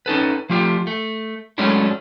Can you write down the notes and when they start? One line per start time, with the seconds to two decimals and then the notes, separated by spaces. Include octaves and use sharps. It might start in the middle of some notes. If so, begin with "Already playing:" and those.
0.06 C#4 D#4 A4 B4
0.50 F3 A3 F4 G4
0.87 A3
1.58 F#3 G#3 A3 C#4 D4 E4